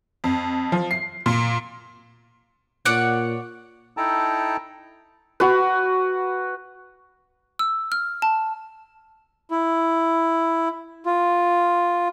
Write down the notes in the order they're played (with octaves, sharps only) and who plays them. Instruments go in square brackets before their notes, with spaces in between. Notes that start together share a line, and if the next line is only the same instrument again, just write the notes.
[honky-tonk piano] F2
F3
C7
A#2
[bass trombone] A#2 [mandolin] C#5 D5 F#5
[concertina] D#4 E4 A4 G5 A5 A#5
[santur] F#4 B4
[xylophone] E6
F6
A5
[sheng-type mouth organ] E4
F4